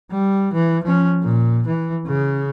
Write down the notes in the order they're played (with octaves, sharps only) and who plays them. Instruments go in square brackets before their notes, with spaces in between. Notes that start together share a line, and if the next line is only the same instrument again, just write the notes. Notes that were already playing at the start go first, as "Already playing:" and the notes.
[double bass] G3
E3
F3 C#4
A#2
E3
C#3